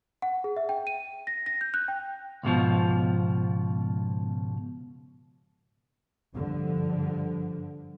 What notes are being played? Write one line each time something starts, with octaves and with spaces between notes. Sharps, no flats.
F#5
G#4
E5
G5
D#7
A#6
A#6
G6
F#6
G5
C#2 G#2 B2 F3
G2 D3 F3